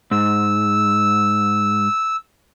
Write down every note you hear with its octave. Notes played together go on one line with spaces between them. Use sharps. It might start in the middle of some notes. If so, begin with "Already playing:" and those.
G#2 E6